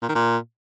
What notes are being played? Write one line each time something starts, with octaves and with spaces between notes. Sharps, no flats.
A#2
D#3
A#2